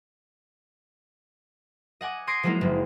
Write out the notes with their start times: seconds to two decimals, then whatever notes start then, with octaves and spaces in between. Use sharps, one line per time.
2.01 D#5 F#5 G#5 D6
2.27 C6 D#6 G#6 A#6 C7 D7
2.43 F3 F#3 G#3 A#3 D#4 E4
2.61 F#1